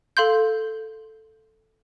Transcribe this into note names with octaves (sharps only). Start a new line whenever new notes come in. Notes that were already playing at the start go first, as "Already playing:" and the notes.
A4 F5 C6 G6